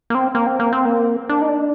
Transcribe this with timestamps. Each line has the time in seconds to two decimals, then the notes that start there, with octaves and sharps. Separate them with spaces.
0.10 A#3
0.15 C4
0.35 A#3
0.47 C4
0.60 A#3
0.73 C4
0.85 A#3
1.29 D4
1.42 D#4
1.49 D4